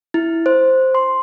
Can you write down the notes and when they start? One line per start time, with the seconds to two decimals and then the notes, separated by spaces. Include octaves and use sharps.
0.14 E4
0.46 C5
0.95 C6